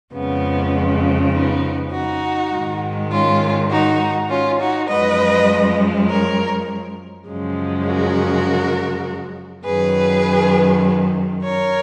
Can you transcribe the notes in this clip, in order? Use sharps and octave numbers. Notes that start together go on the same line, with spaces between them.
F2 C#3 F3 G#3 B3
B3 D#4
D#4 F#4
G#2 D#3 G#3
C#4 F4
D#4 F#4
C#4 F4
D#4 F#4
F#2 F3 G#3 B4 D#5
A#4 C#5
F#2 C#3 F3 G#3
F#4 A#4
F#2 D#3 F#3 G#4 B4
A#4 C#5